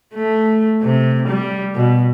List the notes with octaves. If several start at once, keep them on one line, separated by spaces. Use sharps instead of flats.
A3
C3
G3
B2